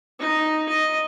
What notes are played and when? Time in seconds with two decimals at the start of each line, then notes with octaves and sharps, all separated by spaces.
0.20 D#4
0.69 D#5